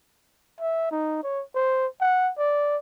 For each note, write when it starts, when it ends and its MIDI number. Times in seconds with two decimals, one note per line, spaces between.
0.60 0.89 76
0.91 1.22 63
1.23 1.43 73
1.55 1.87 72
2.01 2.31 78
2.38 2.77 74